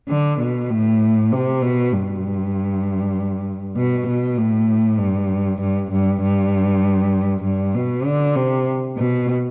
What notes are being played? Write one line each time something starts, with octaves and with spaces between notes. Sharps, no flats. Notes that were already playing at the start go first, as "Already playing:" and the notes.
D3
B2
A2
C3
B2
G2
B2
B2
A2
G2
G2
G2
G2
G2
B2
D3
C3
B2